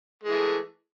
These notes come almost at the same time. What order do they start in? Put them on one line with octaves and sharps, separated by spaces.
G#3 E3 A3